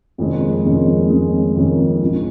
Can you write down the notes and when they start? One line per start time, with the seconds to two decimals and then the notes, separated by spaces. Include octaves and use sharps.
0.18 F1 F2 D#3 G#3 C#4
0.64 F1 F2 D#3 G#3 C#4
1.09 F1 F2 D#3 G#3 C#4
1.55 F1 F2 D#3 G#3 C#4
2.01 A#1 A#2 G#3 C#4